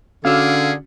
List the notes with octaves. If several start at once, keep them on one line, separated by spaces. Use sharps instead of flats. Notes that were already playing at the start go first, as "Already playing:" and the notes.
D3 C#4 F#4 G#4 F5 E6 F6